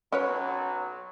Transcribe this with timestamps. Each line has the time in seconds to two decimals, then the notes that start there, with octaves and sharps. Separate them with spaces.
0.12 B1 F#3 C#4 B4 C#5